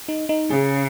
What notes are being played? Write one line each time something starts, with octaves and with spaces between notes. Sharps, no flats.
D#4
D#4
C#3 G#4